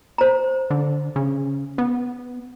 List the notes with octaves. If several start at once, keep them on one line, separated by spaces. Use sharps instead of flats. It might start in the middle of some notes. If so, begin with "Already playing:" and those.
C5 A#5
D3
C#3
B3